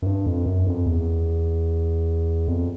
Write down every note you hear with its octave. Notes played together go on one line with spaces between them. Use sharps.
F#2
G2
F2
F#2
F2
E2
F2